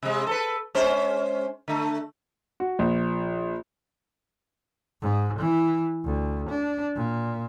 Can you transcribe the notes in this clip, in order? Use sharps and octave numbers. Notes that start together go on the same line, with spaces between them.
C3 G#3
A4 B4
G#3 C#4 C5
D3 A3
F#4
A#1
G#2
E3
D2
D4
A#2